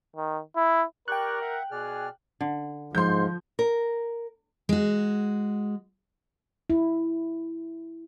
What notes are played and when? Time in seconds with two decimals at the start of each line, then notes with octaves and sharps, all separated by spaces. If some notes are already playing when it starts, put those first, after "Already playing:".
0.16 D#3
0.56 E4
1.08 G4 A#4 D5 G5 C#6 F#6
1.41 E5 F#5
1.71 B2 G#4 D5 F6
2.41 D3
2.95 G#2 F3 C6 G6
3.59 A#4
4.69 G#3 F#4
6.70 E4